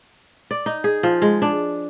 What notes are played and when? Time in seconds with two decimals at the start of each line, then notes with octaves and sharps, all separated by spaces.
0.51 D5
0.66 D#4
0.84 G#4
1.03 F3
1.22 G#3
1.42 D4